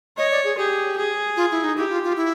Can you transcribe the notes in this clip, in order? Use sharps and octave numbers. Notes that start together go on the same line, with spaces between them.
C#5 D#5
D5
G#4
G4 G#4
G#4
F4
E4
D#4
E4 G4
F4
F4
E4